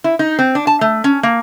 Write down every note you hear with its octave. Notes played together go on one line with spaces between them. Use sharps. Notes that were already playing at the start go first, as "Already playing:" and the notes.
E4
D#4
C4
D4
A5
A3
C#4
A#3